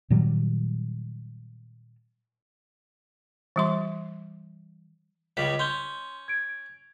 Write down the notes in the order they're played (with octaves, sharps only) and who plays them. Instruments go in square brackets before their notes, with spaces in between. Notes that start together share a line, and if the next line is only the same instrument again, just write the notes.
[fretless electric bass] A#2 D#3 F#3 G3
[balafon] E3 G3 C6
[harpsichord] C#2 C#3 G3 [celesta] B6
[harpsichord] C#4 [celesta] C6 G6 G7
[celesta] G#6 D7